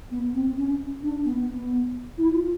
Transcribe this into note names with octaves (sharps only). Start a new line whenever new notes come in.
B3
C4
C#4
D4
B3
B3
E4
F4